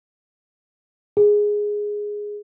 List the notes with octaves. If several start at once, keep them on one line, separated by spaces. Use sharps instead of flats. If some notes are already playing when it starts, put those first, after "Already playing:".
G#4